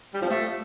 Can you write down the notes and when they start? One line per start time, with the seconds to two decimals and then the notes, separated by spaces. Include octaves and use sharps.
0.13 G3
0.21 F3
0.29 A3